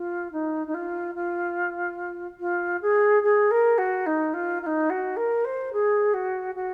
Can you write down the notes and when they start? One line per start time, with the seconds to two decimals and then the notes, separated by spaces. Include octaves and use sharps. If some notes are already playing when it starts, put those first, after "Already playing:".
Already playing: F4
0.32 D#4
0.67 D#4
0.74 F4
1.15 F4
2.39 F4
2.81 G#4
3.22 G#4
3.51 A#4
3.78 F#4
4.06 D#4
4.33 F4
4.62 F4
4.66 D#4
4.90 F#4
5.16 A#4
5.44 C5
5.73 G#4
6.13 F#4
6.55 F#4